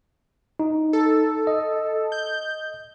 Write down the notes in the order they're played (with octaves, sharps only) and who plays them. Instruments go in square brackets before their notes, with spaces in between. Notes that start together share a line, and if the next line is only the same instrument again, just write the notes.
[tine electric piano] D#4
[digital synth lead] A4
[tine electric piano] D#5
[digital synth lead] G6